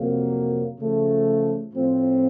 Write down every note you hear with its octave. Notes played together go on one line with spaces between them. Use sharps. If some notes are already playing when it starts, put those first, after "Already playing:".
Already playing: F2 C3 F#3 A#3
C#3 F3 A3
A2 F3 C4 F4